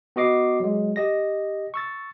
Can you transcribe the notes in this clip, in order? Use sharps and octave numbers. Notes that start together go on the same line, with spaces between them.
B3 F#4 D#5 D6 C7
F#3 G#3
G4 D#5 A#6
C#6 E6 A6